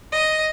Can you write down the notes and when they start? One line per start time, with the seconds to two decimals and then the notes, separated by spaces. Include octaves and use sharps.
0.12 D#5